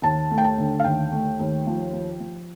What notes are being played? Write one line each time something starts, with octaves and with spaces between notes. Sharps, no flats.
D#2 A5
A3
G5
A5
D3
F5
D#2 G5
A3
D#2
F3
F3
F3